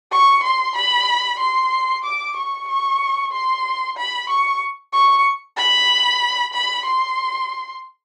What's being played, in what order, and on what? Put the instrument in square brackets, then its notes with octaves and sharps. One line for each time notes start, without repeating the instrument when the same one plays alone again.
[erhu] C#6
C6
B5
C6
D6
C#6
C#6
C6
B5
C#6
C#6
B5
B5
C6